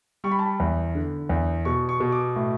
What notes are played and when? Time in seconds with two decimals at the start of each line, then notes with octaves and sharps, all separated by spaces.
0.24 G3 C#6
0.31 B5
0.39 A5
0.45 B5
0.60 E2
0.95 D3
1.29 E2
1.65 B2 C#6
1.89 C#6
2.00 B2
2.12 D6
2.36 A2